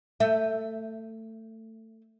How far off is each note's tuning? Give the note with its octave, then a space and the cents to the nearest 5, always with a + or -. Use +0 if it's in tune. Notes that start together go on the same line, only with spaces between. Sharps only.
A3 +20 E5 +0